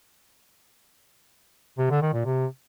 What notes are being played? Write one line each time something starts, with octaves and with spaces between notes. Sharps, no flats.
C3
D3
D#3
A#2
C3